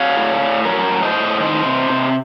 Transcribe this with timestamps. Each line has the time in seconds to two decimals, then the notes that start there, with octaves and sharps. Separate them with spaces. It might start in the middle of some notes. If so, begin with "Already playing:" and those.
Already playing: F#3 C#5 F5
0.17 A2
0.41 A2
0.65 F#3 A#4 C#5
0.90 A2
1.03 C5 D#5
1.16 A2
1.40 D#3 C5 D#5
1.65 C3
1.90 C3